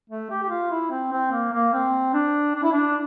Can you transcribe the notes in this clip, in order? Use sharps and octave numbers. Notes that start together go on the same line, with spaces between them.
A3
G4
G4
F4
E4
C4
C4
A#3
A#3
C4
D4
D4
E4
D4